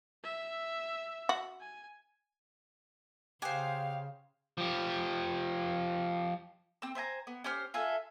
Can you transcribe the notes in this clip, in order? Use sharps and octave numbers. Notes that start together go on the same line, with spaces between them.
E5
F#4
G#5
C#3 G4 C5 D#5 F5 F#5 G#5
F3 G4
C4 E6
C5 E5 G#5 A#5
B3
C#4 G4 C5 F6
F4 G#4 A4 E5